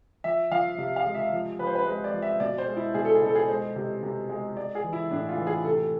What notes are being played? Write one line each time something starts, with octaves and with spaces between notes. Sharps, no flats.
F3 E5
F3 F5
C3 E5
F5
G#3
E5
F3
F3 B4
C5
B4
G#3 B4
D5
F3
E5
B2 D5
C5
G#3
E4
B2 G#4
A4
G#4
B2 A4
G#4
G#3 C5
C3
C3
G#3
G#3 D5
G#4
E3
E4
A2 D4
F4
E3
G#4
C3 A4